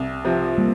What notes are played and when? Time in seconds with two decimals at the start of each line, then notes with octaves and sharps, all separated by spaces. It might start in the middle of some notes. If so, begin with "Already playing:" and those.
Already playing: C2
0.24 C3 F3
0.58 G3 A#3